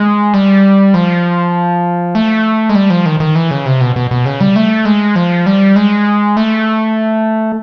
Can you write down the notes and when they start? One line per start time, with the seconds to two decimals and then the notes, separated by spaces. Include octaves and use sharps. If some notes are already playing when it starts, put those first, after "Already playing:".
Already playing: G#3
0.34 G3
0.94 F3
2.15 A3
2.69 G#3
2.75 G3
2.90 F3
3.06 D#3
3.20 D#3
3.35 E3
3.51 C#3
3.66 C3
3.81 B2
3.96 B2
4.11 B2
4.26 C#3
4.41 G3
4.56 A3
4.85 G#3
5.16 F3
5.46 G3
5.76 G#3
6.37 A3